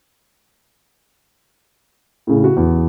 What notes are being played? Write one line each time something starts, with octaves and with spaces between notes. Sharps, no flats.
A2 C#3
F#4
E2